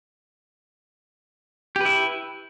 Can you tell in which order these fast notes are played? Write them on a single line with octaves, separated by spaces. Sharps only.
G4 B4 E4